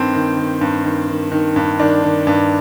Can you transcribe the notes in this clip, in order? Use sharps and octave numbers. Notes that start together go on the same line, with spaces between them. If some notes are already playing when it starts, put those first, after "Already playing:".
Already playing: G2 D#3 C4
D#3
D#3
G2
D#3
D#3
D#3
G2
D#3 D4
D#3
G2